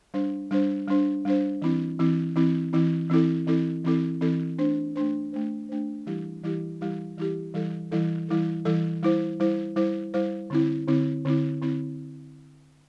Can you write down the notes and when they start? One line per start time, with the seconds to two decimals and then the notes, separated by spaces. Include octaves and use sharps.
0.14 G3 D4 C5
0.51 G3 D4 C5
0.88 G3 D4 C5
1.25 G3 D4 C5
1.62 E3 C4 E4
1.99 E3 C4 E4
2.36 E3 C4 E4
2.73 E3 C4 E4
3.10 E3 C4 E4 A4
3.47 E3 C4 E4 A4
3.85 E3 C4 E4 A4
4.21 E3 C4 E4 A4
4.59 A3 D4 C5
4.96 A3 D4 C5
5.33 A3 D4 C5
5.69 A3 D4 C5
6.07 E3 G3 E4 G4
6.43 E3 G3 E4 G4
6.81 E3 G3 E4 G4
7.17 E3 G3 E4 G4
7.54 E3 G3 E4 A4
7.92 E3 G3 E4 A4
8.28 E3 G3 E4 A4
8.65 E3 G3 E4 A4
9.03 G3 E4 C5
9.40 G3 E4 C5
9.76 G3 E4 C5
10.14 G3 E4 C5
10.50 D3 C4 E4
10.87 D3 C4 E4
11.25 D3 C4 E4
11.61 D3 C4 E4